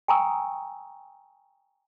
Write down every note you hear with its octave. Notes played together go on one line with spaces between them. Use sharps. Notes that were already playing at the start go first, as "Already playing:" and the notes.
G5 G#5 A#5 C#6 D#6 E6